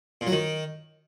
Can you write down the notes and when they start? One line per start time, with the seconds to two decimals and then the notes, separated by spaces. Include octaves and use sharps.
0.21 A#2
0.27 F#3
0.32 D#3